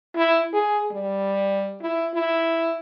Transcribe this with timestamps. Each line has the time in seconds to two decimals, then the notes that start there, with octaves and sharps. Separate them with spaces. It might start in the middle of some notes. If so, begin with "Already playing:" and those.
0.16 E4
0.53 G#4
0.91 G3
1.82 E4
2.15 E4